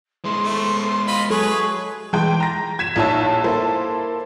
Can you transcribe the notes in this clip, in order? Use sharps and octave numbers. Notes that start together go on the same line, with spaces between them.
G#3 E4 C6
A3
F4 D#5 B5
F#3 G#4 A4 B4 C#5
E3 G#3 G5
A#5 A#6
G#6 B6 E7
A#1 D#4 E4 C#5 A5 E6
A#3 E4 A4 C5